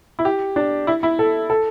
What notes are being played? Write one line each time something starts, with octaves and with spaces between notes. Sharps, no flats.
E4
G4
D4
E4
E4
A4
A4